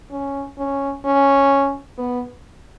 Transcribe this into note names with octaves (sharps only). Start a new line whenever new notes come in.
C#4
C#4
C#4
B3